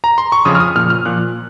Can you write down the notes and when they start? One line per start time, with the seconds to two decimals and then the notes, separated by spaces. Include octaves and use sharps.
0.04 A#5
0.18 C6
0.32 C#6
0.45 F2 C#3 F3 D#6
0.55 F6
0.60 D#6
0.75 A#2 F3 F6
0.90 F6
1.05 A#2 F3 F#6